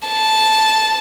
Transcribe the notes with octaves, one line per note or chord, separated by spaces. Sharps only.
A5